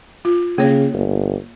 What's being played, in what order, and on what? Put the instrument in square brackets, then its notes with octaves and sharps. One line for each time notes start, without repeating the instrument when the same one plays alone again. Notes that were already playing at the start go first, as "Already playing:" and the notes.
[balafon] F4
[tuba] C#3 [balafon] A#3 C#5
[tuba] G1